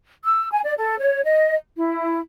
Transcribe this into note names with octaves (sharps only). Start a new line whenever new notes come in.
E6
G#5
D5
A4
C#5
D#5
E4